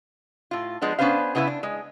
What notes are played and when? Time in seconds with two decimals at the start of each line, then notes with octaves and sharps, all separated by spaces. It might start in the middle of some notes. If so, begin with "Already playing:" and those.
0.51 A2 F4
0.82 F3 G#3 B3 D4
0.99 B3 C#4 D4 B4 C5 F5
1.35 C#3 B3 E4 B4 E5
1.47 D4
1.63 G#3